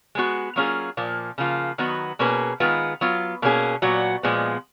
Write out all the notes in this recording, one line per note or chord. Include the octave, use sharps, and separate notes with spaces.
G#3 B3 F#4
F#3 A#3 C#4 F4 G#4
A#2 F3 A#3
C#3 F3 A#3 F4
D#3 F#3 B3 F#4 B4
B2 A#3 C#4 G#4 B4
D#3 G#3 B3 F4 B4
F#3 B3 F4
B2 A#3 C#4 G#4
A#2 F#3 B3 F#4
A#2 F3 G#3 B3